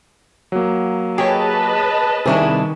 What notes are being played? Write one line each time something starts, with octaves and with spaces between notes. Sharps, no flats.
F#3 A#3
G4 G#4 B4 C#5 D#5 A5
C3 D#3 G3 D4 E4 G#4 C#6